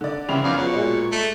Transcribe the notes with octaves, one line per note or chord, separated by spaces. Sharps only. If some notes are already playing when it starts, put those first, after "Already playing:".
D3 D5
C#3 E3 G3 C5 F7
F#2 F3 B3 D#4 D5 F5
B2 F3 F#3 C#5
A#2 G#3
A3